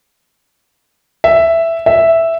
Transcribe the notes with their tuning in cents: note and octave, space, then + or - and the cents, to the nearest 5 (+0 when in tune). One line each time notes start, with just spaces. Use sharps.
E5 +5
E5 +0